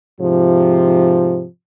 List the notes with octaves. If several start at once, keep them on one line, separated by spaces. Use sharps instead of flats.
G#2 C3 F3